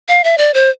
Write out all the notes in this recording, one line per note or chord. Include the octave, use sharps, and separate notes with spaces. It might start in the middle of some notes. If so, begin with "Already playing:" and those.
F5
E5
D5
C5